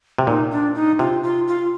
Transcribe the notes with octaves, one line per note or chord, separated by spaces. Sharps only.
C3
A#2 D#4
D4
D#4
C3 F4
F4
F4